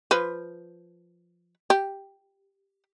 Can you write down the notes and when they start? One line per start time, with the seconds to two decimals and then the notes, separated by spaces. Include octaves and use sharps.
0.11 F3 B4
1.70 G4